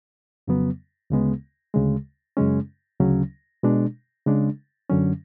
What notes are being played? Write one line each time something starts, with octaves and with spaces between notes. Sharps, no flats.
F2 C#3 F#3 B3
D2 C#3 G#3 B3
D2 C#3 G#3
F#2 C#3 G#3 C#4
D2 C#3 F#3 C#4
B2 G#3 D4
C#3 G#3 D4
F#2 D3 F#3 C#4